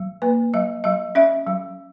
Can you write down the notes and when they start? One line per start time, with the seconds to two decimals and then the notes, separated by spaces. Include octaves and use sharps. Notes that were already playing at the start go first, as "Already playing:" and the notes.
Already playing: F#3
0.22 A#3 B4
0.53 F#3 D#5
0.84 F#3 D#5
1.15 C#4 E5
1.47 F#3